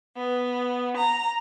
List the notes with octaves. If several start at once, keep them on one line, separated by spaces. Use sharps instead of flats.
B3
A#5